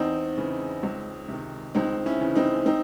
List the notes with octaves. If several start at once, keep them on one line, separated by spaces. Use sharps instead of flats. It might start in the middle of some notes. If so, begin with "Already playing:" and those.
Already playing: E2 C4 D#4
C#3 E3
C#2
C3 D#3
C#2 C4 D#4
C#4 E4
C#3 E3
C4 D#4
C4 D#4